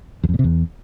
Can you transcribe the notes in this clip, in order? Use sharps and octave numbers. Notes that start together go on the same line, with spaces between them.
E2
F2
A#2
C3
E2